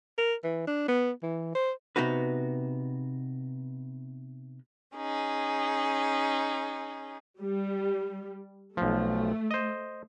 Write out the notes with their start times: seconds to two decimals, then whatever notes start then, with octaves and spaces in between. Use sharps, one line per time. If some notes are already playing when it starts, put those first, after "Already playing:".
0.18 A#4
0.44 E3
0.67 D4
0.88 B3
1.22 E3
1.55 C5
1.96 C3 B3 D#4 F#4 B4
4.95 C#4 D#4 G#4
7.41 G3
8.77 B1 F3 A3
9.51 C5 D#5